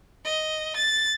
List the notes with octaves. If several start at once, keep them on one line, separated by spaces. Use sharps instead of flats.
D#5
A6